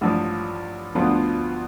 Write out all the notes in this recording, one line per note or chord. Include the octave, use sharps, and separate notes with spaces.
A1 G2 F3
D2 D3 F3 B3 F4